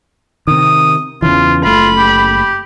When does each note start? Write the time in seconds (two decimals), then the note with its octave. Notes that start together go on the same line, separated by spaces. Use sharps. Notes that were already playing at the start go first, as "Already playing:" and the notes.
0.47 C3 D#3 D#6
1.22 E2 C#3 E3 F4
1.64 F#1 A3 F4 B5
1.98 G4